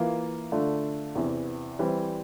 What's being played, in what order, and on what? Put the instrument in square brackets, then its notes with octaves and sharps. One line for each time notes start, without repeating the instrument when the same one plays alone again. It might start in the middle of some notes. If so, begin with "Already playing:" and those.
Already playing: [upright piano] E3 A#3 F4
D3 A3 D4 F4
E2 C3 E3
E3 G3 C4